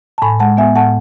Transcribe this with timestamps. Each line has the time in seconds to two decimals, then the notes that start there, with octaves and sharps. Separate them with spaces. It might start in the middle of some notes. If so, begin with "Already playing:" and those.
0.18 A5
0.22 A2 G#5 B5
0.40 G#3 F#5 A5
0.57 B3 E5 G#5
0.76 A2 F#5 A5